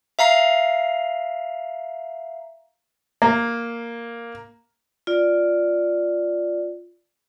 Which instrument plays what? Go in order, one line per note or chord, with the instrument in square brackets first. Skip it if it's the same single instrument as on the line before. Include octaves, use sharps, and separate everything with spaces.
[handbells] E5 F5 A#5 C7
[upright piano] A#3
[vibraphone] F4 D5